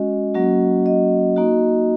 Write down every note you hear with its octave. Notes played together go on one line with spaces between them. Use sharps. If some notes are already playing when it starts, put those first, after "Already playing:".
Already playing: G#3 C#4 F#4 D#5
F#3 A#3 C#4 F#4
D#5
A#3 D#4 F#4